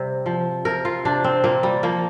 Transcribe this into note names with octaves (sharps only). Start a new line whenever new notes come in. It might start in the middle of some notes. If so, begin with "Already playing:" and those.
Already playing: C3 G3
F3
C3 A#4
F4
C3 D4
C4
A#2 A#3
G3
F3 A#3